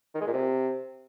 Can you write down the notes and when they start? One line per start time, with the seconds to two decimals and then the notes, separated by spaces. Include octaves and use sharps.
0.15 D#3
0.21 G#3
0.27 A#2
0.33 C3